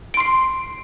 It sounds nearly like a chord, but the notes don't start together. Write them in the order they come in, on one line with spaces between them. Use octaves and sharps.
D7 C6 C7